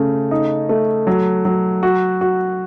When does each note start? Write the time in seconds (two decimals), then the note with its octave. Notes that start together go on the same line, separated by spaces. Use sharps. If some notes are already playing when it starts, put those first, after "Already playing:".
Already playing: C#3 A3
0.31 D#4
0.69 A3
1.07 F#3
1.45 F#3
1.83 F#4
2.21 F#4